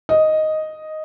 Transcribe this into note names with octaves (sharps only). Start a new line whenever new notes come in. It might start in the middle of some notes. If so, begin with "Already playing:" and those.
D#5